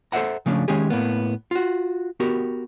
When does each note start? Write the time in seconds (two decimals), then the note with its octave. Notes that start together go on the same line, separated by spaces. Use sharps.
0.12 A4 C5 C#5 E5 F#5 A#5
0.46 C#3 F3 A3 C#4 D4
0.68 D#3 G#3 C#4 G4 G#4
0.90 A2 A#3 B3
1.51 F4 F#4
2.20 B3 F#4 G4 A#4